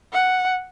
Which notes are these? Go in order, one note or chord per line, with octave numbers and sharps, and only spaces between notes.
F#5